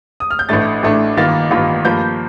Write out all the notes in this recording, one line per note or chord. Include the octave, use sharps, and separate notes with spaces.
D#6
F6
G6
A1 A2 A3 D4 A6
A1 A2 A3 D4
A1 G2 D#3 A#3 F4 A6
A1 G2 D#3 A#3 F4
G2 F3 A#3 F4 G6